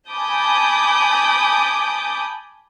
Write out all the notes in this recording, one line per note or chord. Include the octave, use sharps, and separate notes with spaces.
G#5 A5 B5 D6 D#6 G6